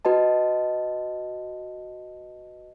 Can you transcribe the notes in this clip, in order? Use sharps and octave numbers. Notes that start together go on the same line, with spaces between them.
F#4 B4 D#5 A5